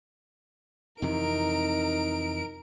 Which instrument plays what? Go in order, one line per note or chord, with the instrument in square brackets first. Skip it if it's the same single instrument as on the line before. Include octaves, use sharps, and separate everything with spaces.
[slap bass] F2 C3 E3 [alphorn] D#4 [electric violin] A#4 D7